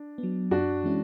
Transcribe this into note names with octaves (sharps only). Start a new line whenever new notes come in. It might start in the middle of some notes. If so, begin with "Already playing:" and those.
Already playing: D4
B3
F#3
F#2 D4 F#4
E3 G#3 C#4 E4